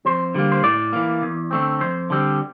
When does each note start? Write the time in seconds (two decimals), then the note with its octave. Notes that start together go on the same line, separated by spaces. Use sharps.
0.05 F2 C5
0.34 D3 G3 A#3
0.52 C5
0.63 A2 D5
0.93 E3 A#3
1.22 E2
1.51 D3 A3 C4
1.80 F2 C5
2.10 D3 G3 C4